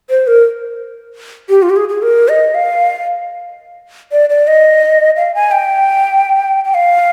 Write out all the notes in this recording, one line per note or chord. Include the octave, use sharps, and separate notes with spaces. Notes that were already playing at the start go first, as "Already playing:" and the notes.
C5
A#4
G4
F4
G4
G#4
G#4
A#4
D#5
F5
D5
D5
D#5
F5
G#5
G5
G5
F5